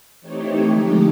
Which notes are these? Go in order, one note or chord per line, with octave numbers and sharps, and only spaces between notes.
E3 A3 C4 D#4 G4 C#5
D3 F3 G#3 A3 D#4 G4